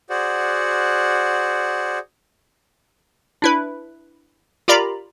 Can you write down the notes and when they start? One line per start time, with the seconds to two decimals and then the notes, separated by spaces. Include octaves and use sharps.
0.10 F#4 G#4 C5 D5 F#5
3.42 D4 E4 B4
4.68 F4 G4 A#4 D5 A#5 B5